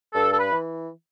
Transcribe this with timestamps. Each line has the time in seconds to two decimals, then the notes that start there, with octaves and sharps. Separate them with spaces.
0.14 G2 A4
0.32 A4
0.38 B4
0.51 E3